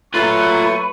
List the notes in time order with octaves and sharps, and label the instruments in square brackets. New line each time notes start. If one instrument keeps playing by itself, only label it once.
[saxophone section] F#3 A3 [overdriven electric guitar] F4 A#5 [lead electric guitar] B4 [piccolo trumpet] C#6